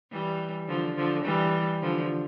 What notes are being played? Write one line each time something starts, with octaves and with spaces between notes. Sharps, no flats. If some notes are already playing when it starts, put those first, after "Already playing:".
E3 G3
D3 F3
D3 F3
E3 G3
D3 F3